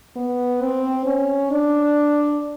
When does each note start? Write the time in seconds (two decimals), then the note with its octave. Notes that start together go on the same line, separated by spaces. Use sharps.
0.16 B3
0.61 C4
1.06 C#4
1.51 D4